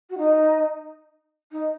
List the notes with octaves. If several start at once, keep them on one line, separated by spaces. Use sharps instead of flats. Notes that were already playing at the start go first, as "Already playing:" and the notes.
F#4
D#4
D#4